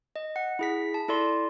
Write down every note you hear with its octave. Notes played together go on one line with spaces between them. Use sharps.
D#5
F#5
E4 G#4 B6
A5
E4 A4 D5 C6